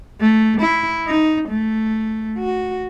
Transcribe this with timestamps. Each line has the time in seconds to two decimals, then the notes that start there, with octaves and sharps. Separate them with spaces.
0.20 A3
0.62 E4
1.07 D#4
1.49 A3
2.38 F#4